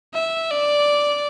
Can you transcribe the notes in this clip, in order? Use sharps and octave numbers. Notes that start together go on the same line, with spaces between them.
E5
D5